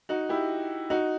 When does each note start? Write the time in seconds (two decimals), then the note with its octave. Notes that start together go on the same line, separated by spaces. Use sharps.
0.09 D#4 F#4
0.29 E4 G4
0.90 D#4 F#4